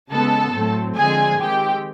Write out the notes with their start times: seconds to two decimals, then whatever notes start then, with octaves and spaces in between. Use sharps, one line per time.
0.11 C#3 E3 G#3 B3 A4 A5
0.53 A2 F#3 A3 C4
0.96 D3 F3 G#3 C4 G#4 G#5
1.39 D#3 G#3 C4 G4 G5